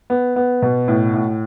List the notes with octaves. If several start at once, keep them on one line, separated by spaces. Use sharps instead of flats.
B3
B3
B2
A2
A2